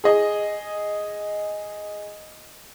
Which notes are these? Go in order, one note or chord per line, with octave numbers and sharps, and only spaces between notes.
G#4 D#5